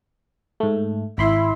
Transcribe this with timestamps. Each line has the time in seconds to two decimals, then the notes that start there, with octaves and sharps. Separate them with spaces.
0.60 G#2 A3
1.18 G#1 E4 B5 C6